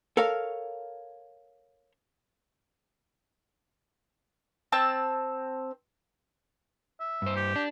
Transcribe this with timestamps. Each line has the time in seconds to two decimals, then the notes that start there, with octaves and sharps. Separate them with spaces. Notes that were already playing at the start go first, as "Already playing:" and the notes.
0.17 A4 A#4 C#5 F5
4.72 C4 A5 E6
7.00 E5
7.22 G2 C5
7.36 G4
7.56 D4